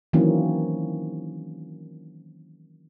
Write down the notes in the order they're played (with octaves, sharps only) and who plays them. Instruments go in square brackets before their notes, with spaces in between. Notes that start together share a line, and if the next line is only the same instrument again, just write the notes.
[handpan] D#3 E3 F#3 A#3 C4 C#4